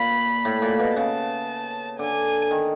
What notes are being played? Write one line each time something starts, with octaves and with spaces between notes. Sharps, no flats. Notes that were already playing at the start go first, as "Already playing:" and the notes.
Already playing: A#2 B5
A2
A#2
B2
C#3 A5
D3 G#5
D#3